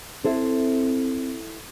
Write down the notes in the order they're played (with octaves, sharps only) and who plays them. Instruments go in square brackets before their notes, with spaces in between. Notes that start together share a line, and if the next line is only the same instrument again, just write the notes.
[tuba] C4 [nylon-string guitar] E4 A4 C5